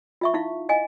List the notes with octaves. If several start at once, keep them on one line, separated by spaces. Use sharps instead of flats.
F4 E5 C#6
D#4 E4 F5
D#5 F5 G#5